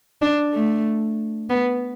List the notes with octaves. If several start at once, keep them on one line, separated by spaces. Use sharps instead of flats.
D4
A3
B3